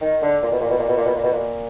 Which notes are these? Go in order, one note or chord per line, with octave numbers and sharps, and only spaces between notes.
D#3
D3
A#2
B2
A#2
B2
A#2
B2
A#2
B2
A#2
B2
A#2